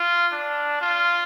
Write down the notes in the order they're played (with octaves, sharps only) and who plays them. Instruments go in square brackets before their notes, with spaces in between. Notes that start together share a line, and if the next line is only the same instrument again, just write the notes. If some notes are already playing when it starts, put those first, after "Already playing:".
Already playing: [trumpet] F4
D4
F4